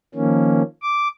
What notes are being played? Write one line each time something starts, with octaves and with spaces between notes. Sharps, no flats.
D#3 F3 A#3 C#4
D6